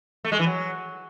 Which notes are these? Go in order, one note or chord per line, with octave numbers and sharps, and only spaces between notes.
A3
G#3
E3
F#3